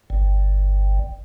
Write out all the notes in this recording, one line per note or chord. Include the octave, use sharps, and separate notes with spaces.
G1